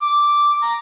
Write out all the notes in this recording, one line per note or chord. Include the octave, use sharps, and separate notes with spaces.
D6
A#5